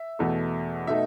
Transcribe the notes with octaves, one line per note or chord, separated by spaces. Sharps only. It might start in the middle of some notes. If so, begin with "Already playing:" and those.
Already playing: E5
E2 B2 A3
B2 A3 D#4 E5